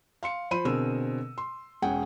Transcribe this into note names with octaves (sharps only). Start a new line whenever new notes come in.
F5 C6 C#7
F3 C5 B5 C6 D#7
B2 D3 C4 G#4 A#4 E6
C6
E1 C#4 G#4 F#5 G5